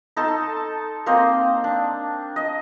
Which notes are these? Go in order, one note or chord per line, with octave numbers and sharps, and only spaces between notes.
D#4 A4 A5 C6
A#3 C4 C5 D#5
D4
D#5